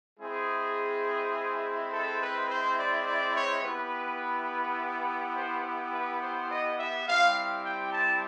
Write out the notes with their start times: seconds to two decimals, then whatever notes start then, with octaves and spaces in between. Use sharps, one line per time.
0.19 G#3 C4 E4 G#4
1.91 A4
2.20 B4
2.49 C5
2.77 D5
3.06 D5
3.34 C#5
3.62 B3 E4 G4 B4
5.34 C5
5.92 B4
6.20 C5
6.49 D#5
6.78 E5
7.06 G3 C4 E4 G4 F5
7.35 F5
7.63 G5
7.92 A5